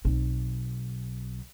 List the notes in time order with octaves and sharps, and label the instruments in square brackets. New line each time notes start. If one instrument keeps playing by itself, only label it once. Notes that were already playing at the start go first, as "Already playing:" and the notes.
[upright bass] B1 C4